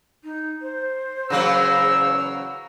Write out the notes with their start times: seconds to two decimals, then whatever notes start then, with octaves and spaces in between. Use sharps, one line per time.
0.23 D#4
0.62 C5
1.30 E2 C#3 F#3 A#3 A#5 E6